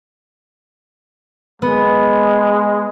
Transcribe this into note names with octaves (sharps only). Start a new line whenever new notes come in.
G#3 B3